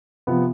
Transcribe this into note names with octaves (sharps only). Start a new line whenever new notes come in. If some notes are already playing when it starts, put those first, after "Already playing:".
C3 F3 B3